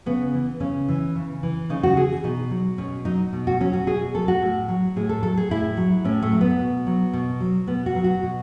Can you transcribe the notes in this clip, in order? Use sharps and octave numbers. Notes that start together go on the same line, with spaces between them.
C#3 B3
E3
C#3 C#4
E3
C#3
E3
C#3 D#4
F#4
E3 G#4
B2 D#4
F#3
B2 C#4
F#3 D#4
B2
F#4
F#3 C#4
F#4
B2 G#4
F#3 A4
F#4
A2
F#3
A2 G#4
A4
F#3 A4
G#4
A2 E4
F#3
A2 C#4
A3
F#3
B3
B2
F#3
B2
F#3
B2 B3
F#4
F#3
F#4
B2